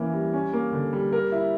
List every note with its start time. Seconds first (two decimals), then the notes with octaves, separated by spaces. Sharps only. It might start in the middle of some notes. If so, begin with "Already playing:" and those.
Already playing: E3 A#3 C#4 E4
0.14 G3
0.33 C#4
0.53 A#3
0.73 D3
0.93 G3
1.13 A#4
1.32 E4